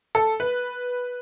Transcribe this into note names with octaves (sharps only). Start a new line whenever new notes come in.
A4
B4